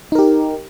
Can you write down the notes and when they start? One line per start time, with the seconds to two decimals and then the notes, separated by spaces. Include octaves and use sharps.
0.12 D#4
0.15 A#4
0.19 G4